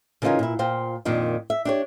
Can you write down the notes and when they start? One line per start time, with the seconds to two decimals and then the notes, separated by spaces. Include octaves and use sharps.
0.22 C#3 E3 C#4 D#4 F4 A#4
0.39 A#2 E4
0.59 A#2 F4 C5 F5 G5
1.05 F2 A#2 D#3 D4
1.50 E5
1.65 D4 G4 C#5